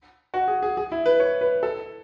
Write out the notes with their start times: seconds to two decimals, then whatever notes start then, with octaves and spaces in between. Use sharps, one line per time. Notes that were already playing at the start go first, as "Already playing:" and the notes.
0.34 F#4
0.48 G#4
0.62 G#4
0.77 G#4
0.92 E4
1.06 B4
1.20 C#5
1.41 B4
1.63 A4